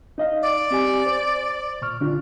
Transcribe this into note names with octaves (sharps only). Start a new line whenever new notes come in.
D#4 D#5 F5
D5
C4 G4 G#5
C5
A#2 C#6 F6
D3 D4 F4